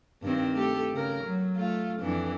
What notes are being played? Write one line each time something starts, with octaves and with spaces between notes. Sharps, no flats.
G2 D#3 C4
A3 G4 A4
C#3 A#4
F#3
A3 F4
F2 E3 D4